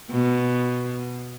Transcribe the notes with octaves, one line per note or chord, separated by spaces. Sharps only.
B2